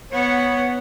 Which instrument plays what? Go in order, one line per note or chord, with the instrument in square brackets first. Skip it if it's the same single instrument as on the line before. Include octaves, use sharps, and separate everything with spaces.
[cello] B3 F#5 [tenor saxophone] C#5